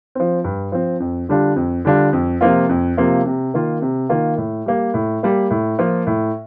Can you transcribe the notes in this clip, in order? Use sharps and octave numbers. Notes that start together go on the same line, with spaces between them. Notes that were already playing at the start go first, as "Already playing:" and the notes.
F3 C4
G2
F3 C4
F2
D3 G3 D4 F4
F2
D3 G3 D4 F4
F2
C3 F3 A#3 F4
F2
C3 F3 A#3 F4
C3
D#3 A#3 F4
C3
D#3 A#3 F4
A2
G3 A#3
A2
G3 A#3
A2
F3 A#3 F4
A2